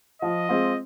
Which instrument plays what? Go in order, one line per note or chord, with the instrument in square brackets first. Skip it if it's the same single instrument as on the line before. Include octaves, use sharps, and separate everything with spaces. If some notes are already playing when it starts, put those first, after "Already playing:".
[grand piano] F3 [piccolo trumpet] D#5
[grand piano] G#3 C4 F4